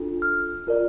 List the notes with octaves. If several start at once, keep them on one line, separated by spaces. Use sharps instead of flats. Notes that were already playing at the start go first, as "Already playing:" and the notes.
Already playing: D4 F4 A4
F6
F4 A#4 D5